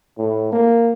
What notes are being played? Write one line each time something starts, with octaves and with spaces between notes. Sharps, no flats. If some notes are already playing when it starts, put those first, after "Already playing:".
A2
A#3